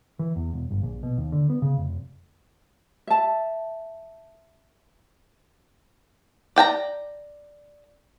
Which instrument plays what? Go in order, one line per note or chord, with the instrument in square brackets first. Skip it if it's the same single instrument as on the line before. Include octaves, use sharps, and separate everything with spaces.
[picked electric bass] E3
E2
E1
G1
A#1
B2
D#2
D3
B3
C#3
F1
[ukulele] E5 A5
[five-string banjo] D5 G5 A5 A#5